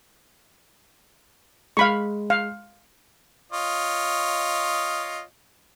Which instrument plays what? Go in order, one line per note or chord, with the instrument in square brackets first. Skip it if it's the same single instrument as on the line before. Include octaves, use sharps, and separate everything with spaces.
[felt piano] G#3 [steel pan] F5 B5 C#6
[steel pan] F5
[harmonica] F4 C#5 D#5